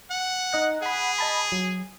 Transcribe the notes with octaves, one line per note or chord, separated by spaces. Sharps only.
F#5
D#4 D#5 F#6
G#4 F#5 B5
D#5 A5 B5
F#3